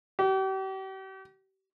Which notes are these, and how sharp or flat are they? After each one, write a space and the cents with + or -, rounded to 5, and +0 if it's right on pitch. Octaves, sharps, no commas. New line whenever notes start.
G4 -40